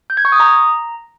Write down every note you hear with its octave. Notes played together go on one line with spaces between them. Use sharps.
G6
G#6
C#6
D#6
A#5